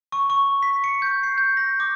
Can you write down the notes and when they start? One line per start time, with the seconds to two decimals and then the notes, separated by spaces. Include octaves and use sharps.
0.12 C#6
0.30 C#6
0.63 B6
0.84 C#7
1.02 G6
1.23 C7
1.38 G6
1.57 A#6
1.80 D6